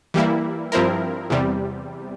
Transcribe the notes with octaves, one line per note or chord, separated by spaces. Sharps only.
E3 G3 A#3 E4
G2 F3 C4 E4 A#4
E2 C3 G3